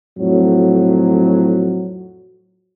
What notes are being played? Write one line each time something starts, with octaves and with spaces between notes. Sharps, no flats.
F2 A2 F#3